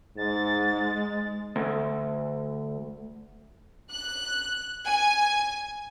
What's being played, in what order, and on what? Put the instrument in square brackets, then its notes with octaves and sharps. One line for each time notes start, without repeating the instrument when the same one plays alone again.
[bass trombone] G#2 [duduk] G#3 [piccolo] A6
[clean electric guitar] D2
[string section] F#6
G#5